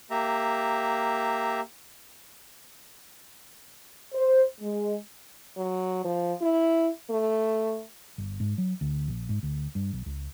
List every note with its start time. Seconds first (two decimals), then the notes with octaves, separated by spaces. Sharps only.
0.11 A#3 G4 E5 A#5
4.13 C5
4.60 G#3
5.57 F#3
6.05 F3
6.42 E4
7.10 A3
8.18 G1
8.40 G#2
8.58 F#3
8.81 D2
9.08 A#1
9.29 G#2
9.43 D2
9.75 G2
9.93 B1
10.06 C#2